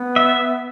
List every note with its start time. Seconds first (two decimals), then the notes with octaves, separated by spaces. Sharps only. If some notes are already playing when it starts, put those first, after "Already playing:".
Already playing: B3
0.16 E5